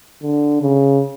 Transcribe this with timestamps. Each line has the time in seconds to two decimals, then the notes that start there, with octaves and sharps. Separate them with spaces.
0.22 D3
0.61 C#3